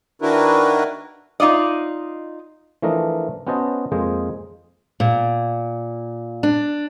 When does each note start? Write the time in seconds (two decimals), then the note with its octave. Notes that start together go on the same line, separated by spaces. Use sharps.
0.22 D#3 D4 E4 F#4 A#4 B4
1.40 D#4 F4 D5 D#5
2.82 E3 F3 A3 D4 A#4 D#5
3.47 B3 C#4 F#4 C5 D#5 A5
3.92 F2 G#3 A#3 G#4 C5 D#5
5.00 A#2
6.43 D4